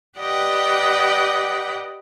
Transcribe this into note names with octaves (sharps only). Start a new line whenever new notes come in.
G4 B4 D5 D#5 F#5 G5